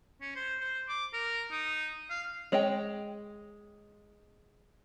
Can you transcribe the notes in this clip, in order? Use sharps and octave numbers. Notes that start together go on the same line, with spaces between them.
C#4
C5
C5
D6
A#4
D#4
F5
G#3 C#5 D#5 G5